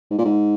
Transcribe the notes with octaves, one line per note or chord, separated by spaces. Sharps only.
G#2
A#2
G#2